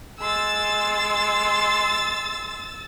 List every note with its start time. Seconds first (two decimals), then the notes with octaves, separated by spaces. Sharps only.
0.20 G#3 C6 E6 A6